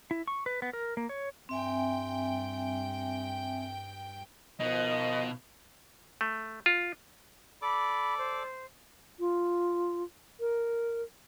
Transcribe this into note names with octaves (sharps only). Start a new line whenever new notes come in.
E4
C#6
B4
B3
A#4
A#3
C#5
G2 C4 E5 G5 G#5
B2 D#3 F3 D#5
A3
F4
A4 D5 B5 D6
C5
F4
A#4